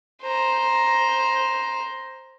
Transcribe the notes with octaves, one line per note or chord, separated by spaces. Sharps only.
C5 A#5